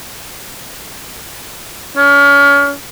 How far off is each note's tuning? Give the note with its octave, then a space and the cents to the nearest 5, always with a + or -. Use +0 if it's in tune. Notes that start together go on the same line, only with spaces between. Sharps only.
C#4 +35